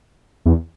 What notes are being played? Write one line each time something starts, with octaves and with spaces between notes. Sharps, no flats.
E2